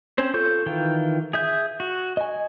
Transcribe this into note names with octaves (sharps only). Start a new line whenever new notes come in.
C4 C#4 C5
F4 A4 C#6 G6
D#3 E3 F4 G5
G#4 E5 G6
F#4
D#5 G#5